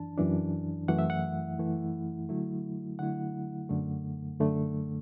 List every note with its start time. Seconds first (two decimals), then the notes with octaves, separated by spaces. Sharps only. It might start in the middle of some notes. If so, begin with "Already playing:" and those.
Already playing: F#2 E3 D4 A5
0.18 F#2 E3 D4
0.88 F#2 E3 A3 E4 F#5
0.99 E5
1.10 F#5
1.59 F#2 E3 A3 E4
2.29 D3 F#3 A3 E4
2.99 D3 F#3 A3 E4 F#5
3.69 F#2 D3 A3
4.40 F#2 D3 A3